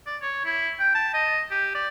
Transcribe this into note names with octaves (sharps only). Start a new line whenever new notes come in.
D5
C#5
E4
G5
A5
D#5
G4
D5